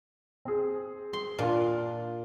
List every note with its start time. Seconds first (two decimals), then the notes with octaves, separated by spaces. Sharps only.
0.45 C4 G#4
1.13 C6
1.39 A#2 D4 F4